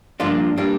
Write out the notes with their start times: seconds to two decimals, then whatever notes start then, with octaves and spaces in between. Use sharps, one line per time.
0.20 G2 F3 A#3 D4 F4
0.58 G3 A#3 D4